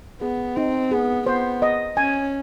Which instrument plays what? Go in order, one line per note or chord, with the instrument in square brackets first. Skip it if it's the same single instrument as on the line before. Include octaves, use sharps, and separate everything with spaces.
[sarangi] B3 [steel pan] G#4
[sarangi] C4 [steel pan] D#4
[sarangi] B3 [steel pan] G#4
[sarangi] B3 [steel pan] C5
[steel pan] D#5
[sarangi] C#4 [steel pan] G#5